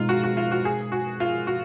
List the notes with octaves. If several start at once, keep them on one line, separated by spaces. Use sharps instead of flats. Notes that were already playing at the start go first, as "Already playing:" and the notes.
Already playing: B2 G#3 D#4 F4
F#4
F#4
F4
F#4
G#4
F#4
F4
F#4